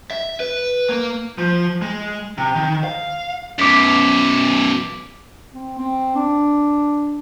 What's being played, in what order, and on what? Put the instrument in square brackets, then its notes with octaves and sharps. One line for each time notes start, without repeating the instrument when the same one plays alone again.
[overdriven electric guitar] E5
B4
A#3
[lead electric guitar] F3
G#3
C3
D#3
F5
[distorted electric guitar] F#2 B2 [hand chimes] D6 B6
[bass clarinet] C4
C4
D4